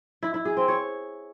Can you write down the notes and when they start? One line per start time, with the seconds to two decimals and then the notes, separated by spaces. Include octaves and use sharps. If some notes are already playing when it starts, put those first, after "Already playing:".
0.23 E4
0.34 E4
0.45 G#4
0.57 C4
0.68 C#5